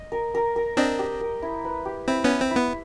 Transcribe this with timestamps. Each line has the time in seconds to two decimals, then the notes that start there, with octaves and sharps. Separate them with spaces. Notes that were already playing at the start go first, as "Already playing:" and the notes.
Already playing: D#5
0.12 A#4
0.35 A#4
0.56 A#4
0.77 C4 D4 D#5
0.99 G4
1.21 A#4
1.42 E4
1.65 B4
1.85 G4
2.08 C4 E4
2.24 B3 C#4 E4
2.41 C4
2.51 B3 E4